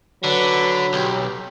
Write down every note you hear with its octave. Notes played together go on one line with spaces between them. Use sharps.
D3 F#3 B4 B5
B1 G4